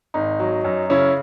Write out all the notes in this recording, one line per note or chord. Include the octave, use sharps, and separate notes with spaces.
G#1 D#4
F#3
F#2
C#3 C#4 E4